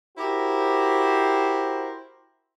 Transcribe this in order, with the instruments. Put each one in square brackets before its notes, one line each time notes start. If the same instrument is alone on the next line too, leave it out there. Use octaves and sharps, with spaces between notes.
[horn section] E4 F#4 G4 A#4 C5